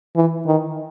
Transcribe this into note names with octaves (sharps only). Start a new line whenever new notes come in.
E3
D#3